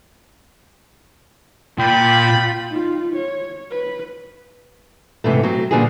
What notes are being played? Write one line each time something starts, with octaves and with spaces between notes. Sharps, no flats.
A#2 F4 D5 G5 B5
D#4 F4
C#5
B4
G#2 C3 E3 A3
F#3 A3 C4
A#2 D3 E3 G3 C#4 G#4